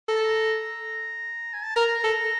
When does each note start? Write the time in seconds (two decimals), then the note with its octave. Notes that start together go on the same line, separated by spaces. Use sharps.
0.09 A4 A#5
0.17 A5
0.24 A#5
1.53 G#5
1.64 A5
1.76 A#4 A#5
2.04 A4